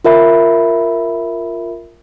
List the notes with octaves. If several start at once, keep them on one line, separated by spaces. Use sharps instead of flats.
F4 A#4 E5 B5